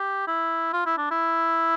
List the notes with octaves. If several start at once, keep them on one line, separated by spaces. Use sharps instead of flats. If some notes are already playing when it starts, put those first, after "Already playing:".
Already playing: G4
E4
F4
E4
D4
E4